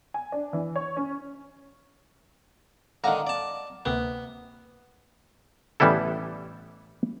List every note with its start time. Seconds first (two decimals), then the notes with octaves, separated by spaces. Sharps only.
0.14 G#5
0.32 D4
0.53 E3
0.76 C#5
0.97 C#4
3.04 D3 D#3 F5 F#5 A#5
3.27 D5 A5
3.85 D2 C3 A#3 B3
5.80 A1 E3 G3 B3 E4 A4